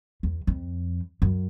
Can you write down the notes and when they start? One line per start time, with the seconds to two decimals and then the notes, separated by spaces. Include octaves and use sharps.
0.23 E2
0.47 F2
1.22 F#2